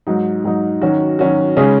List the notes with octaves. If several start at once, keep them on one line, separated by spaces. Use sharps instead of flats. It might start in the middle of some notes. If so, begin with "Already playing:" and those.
G#2 F#3 D#4
G#2 F#3 D#4
D#3 F#3 C#4 F#4
D#3 F#3 C#4 F#4
C#3 G#3 C#4 G#4